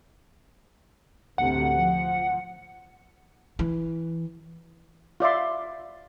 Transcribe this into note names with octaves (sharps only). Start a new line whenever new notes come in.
A1 D2 C3 F#5
F3
E3
F4 D5 E5 C6